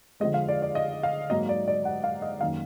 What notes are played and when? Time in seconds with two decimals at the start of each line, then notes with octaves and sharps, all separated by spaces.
0.20 D3 F3 G#3 D#5
0.34 F5
0.48 D5
0.62 D5
0.75 D#5
1.03 F5
1.30 G#2 F#3 A#3 D#5
1.49 D5
1.68 D5
1.85 F#5
2.04 F5
2.22 D#5
2.40 F#2 D#3 A#3 F5